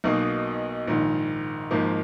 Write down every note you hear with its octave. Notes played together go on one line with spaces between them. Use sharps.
B1 B2 A#3 D#4
A#1 G#2 D#3
G#1 G#2 F3 A#3